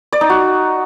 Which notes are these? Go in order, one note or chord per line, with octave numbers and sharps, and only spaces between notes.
D5
D#4
F#4